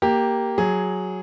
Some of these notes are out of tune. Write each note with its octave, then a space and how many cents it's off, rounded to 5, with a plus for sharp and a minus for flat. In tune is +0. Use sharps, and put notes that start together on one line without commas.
A#3 +0 G4 +0
F#3 +0 G#4 +0